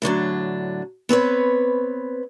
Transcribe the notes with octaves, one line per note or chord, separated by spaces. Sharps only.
A2 D3 F#3 D4
B3 C4 B4 C#5